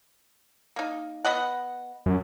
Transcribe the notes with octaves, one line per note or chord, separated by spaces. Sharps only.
A#3 D#4
B3 D#5 F#5
F#2